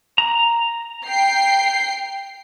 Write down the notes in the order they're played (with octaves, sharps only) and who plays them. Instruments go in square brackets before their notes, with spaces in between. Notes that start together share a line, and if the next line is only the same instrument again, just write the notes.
[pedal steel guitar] A#5
[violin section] G5 C7